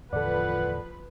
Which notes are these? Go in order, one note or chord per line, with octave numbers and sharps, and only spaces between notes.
E2 A2 D3 F3 A4 B4 D5 F#5